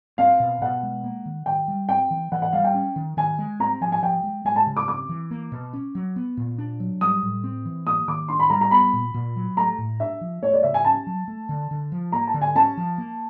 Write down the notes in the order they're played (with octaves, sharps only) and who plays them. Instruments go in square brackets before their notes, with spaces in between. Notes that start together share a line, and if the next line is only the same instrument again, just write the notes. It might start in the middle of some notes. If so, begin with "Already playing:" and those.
[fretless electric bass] C4 [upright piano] F5
[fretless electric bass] B2
[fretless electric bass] B2 [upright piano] F#5
[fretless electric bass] G#3
A#3
D#3
[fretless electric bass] D#3 [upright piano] G5
[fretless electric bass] G3
[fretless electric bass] C4 [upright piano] G5
[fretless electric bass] E3
[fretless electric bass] E3 [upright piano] F#5
[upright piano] F#5
[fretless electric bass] G3 [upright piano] F5
[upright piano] G5
[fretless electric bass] C#4
D#3
[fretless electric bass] D#3 [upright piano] G#5
[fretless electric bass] G#3
[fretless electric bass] C4 [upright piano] A#5
[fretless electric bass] F3 [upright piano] G#5
[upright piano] G#5
[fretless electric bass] F3 [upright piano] G5
[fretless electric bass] G#3
[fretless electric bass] G#3 [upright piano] G#5
[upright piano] A5
[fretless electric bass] C#3
[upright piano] D6
[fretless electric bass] C4 [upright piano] D6
[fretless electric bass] E3
A#3
B2
C#4
F#3
B3
A#2
D4
F#3
[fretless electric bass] G3 [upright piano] D#6
[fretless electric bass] A2
C4
E3
[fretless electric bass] A#3 [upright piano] D#6
[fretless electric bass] D#3 [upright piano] D6
[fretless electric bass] D4 [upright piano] C6
[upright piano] B5
[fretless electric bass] G3 [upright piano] A#5
[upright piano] A#5
[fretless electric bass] B3 [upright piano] B5
[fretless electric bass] A#2
A#2
F#3
[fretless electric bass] A3 [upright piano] A#5
[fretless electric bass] A2
[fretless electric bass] D4 [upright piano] E5
[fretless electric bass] F3
[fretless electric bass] A3 [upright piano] C#5
[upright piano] D5
[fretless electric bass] C#3 [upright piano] E5
[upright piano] G#5
[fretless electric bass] C#4 [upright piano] A5
[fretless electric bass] F#3
A3
D3
D3
F3
[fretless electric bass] A#3 [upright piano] A#5
[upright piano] A5
[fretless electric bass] D3
[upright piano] G#5
[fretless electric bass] C#4 [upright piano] A5
[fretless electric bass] F3
A#3